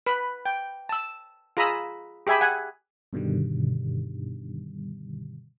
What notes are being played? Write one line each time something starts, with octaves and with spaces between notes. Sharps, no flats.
B4 B5
G5
A5 E6
F4 G#4 A#5 B5 D#6 E6
G4 G#4 E5 G#5 B5
F#5 G#5
G2 B2 D3 D#3 G3